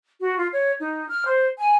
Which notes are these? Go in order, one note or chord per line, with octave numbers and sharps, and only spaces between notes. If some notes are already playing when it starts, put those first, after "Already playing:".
F#4
F4
C#5
D#4
F6
C5
G#5